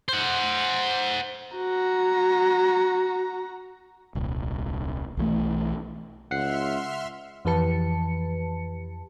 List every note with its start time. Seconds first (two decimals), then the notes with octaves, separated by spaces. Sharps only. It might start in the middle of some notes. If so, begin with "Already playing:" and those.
0.09 C5 F#5
1.57 F#4 A#5
4.15 D#1 C2
5.17 B1 E3 A3
6.31 C#2 E5 F#5 C6 F6 C7
7.45 F2 E3 G4 B4 A5 C#7